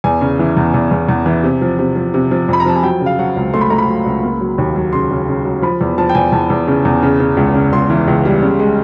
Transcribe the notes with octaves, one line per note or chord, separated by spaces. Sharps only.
E2 G#5
C#3
E3
E2
E2
E2
E2
E3
C3
F3
C3
F3
C3
F3
F2 B5
A#5
F3 A5
G#5
F#3 G5
C#3
F5
F#3 F#5
C#2
A3 C6
B5
A3 A#5
B5
F#3
C#2
A#3
F#3
D#2
F#3
C#3 C6
C#3
C#3
F#3
F3 B5
E2
F3 A5
G5
E2 G#5
E2 A5
E2
C#3
E2
C#3
C#3
C#2
C#3
C#2 C6
E3
C#2
G3
C#3
G#3